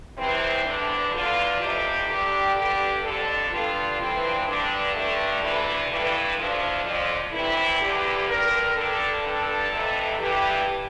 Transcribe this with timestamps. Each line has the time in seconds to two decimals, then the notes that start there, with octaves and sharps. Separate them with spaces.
0.17 E2 C3 E3 C4
0.65 E2 D3 D4
1.13 E2 D3 F4
1.60 F2 C3 E3 G4
2.08 G2 D3 G4
2.56 G2 D3 G4
3.03 F2 D3 A4
3.51 G2 D3 F4
3.98 G2 E3 C4
4.46 G2 D3
4.94 G2 D3 A3
5.42 D2 D3 E3
5.90 G2 E3
6.37 D2 D3 F3
6.84 F2 D3 F3
7.32 D2 C3 E3 E4
7.80 E2 D3 G4
8.28 G2 D3 A#4
8.75 G2 D3 A4
9.23 G2 D3 A4
9.71 F2 C3 E3
10.19 G2 E3 G4